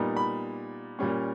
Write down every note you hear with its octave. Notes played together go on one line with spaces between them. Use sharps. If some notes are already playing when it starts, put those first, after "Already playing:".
Already playing: A#2 G3 B3 D#4
B5
A#2 G3 C#4